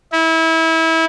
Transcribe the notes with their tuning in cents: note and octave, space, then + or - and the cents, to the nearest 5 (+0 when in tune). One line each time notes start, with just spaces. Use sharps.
E4 -25